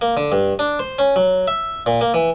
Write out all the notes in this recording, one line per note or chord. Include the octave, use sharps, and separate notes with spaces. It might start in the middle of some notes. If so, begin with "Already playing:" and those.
A#3
D3
G2
D4
C5
C#4
F#3
E5
A#2
A#3
E3